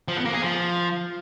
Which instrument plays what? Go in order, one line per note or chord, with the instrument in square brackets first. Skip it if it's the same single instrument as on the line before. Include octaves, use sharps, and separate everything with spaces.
[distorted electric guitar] F3
B3
A#3
G#4
F3